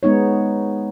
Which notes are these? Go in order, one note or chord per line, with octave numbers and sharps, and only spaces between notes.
G#3 B3 D#4 C#5